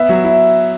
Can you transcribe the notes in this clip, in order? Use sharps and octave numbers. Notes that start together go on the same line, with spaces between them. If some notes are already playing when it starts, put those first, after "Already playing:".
Already playing: B3 E5
F#3
E4